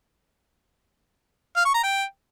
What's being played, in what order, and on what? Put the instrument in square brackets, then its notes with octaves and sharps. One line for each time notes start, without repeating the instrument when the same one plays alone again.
[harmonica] F5
C#6
A#5
G5